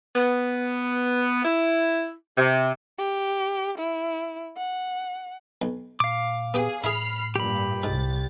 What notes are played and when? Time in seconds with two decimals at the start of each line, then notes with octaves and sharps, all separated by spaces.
0.16 B3
1.45 E4
2.38 C3
2.98 G4
3.78 E4
4.57 F#5
5.62 B1
6.00 A#2 F5 D6
6.54 B3 G4 G#4 G5
6.84 A2 E4 G#4 B5 F6 C7
7.36 G2 A#2 G4 B5
7.84 C2 G#2 A6